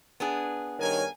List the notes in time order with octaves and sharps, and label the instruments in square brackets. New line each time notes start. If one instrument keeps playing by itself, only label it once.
[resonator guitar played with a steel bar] B3 D4 G#4
[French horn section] G2 D#3 C#5 [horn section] A#4 G#5